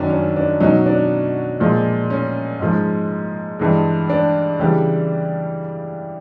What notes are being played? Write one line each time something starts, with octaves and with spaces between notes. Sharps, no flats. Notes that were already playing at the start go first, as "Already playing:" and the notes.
Already playing: F#2 D#3 F#3 C#4 D4
C#4
D4
B2 F#3 C#4 D#4
D4
A#2 F3 G#3
C#4
G#2 F3 G#3
G2 E3 G#3
D4
C#3 E3 G3